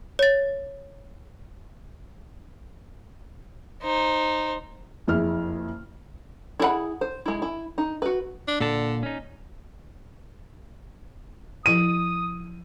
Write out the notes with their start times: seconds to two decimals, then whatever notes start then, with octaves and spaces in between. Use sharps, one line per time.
0.19 C#5 A6
3.82 D#4 C5
5.07 F#1 F2 E4 G#4 F6
6.60 E4 G#4 B4 F#5 B5
7.01 C5
7.26 G#3 E4
7.42 E4
7.78 D#4
8.02 F#4 B4
8.48 D4
8.60 A#2 D3 A5
9.03 C#4 D#4
11.66 F3 E4 A4 D#6 D#7